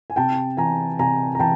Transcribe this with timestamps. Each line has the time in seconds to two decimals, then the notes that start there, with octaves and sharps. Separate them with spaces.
0.10 G#5
0.16 C3 G5 A5
0.57 E3 G#5 A#5
0.99 C3 G#5 A#5
1.35 A#5
1.39 E3 G5 A5